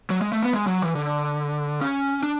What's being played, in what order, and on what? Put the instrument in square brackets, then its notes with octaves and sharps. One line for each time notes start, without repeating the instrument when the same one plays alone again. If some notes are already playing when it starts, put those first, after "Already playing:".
[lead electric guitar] F#3
G#3
A3
B3
G#3
F#3
E3
D3
C#4
D4